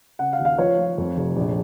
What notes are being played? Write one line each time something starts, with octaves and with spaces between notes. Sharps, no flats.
C#3 F#5
F5
D#2
F5
F3 C#5
F3
F2
F1
A#1